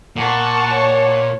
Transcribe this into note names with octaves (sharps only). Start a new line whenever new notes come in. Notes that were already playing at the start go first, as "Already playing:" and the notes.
A#2 F#5 A5 C#6
C#5